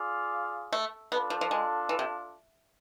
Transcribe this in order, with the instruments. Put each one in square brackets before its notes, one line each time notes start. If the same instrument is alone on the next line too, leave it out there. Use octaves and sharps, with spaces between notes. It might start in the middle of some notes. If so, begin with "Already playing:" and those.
Already playing: [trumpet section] F4 G#4 D5 F5
[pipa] A3
[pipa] B3 [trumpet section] D4 F4 A4
[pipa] F3
F3
G#3
E3
C3